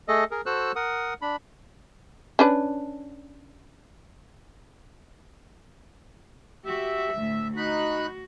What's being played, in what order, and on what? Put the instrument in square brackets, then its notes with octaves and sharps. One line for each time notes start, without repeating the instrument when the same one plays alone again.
[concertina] A3 G#4 A4 D#5
G#4 A#4
F#4 A4 C5 E6 F#6
A#4 F#5 D#6
D4 B5
[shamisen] C#4 D4 B4
[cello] F#4 G4 [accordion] E5
[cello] D2 A2
[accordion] D#4 B5 F#6 [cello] F#4